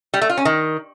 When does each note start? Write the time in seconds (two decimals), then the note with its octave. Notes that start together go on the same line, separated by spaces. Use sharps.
0.14 G3
0.22 A3
0.29 F4
0.37 C#4
0.45 D#3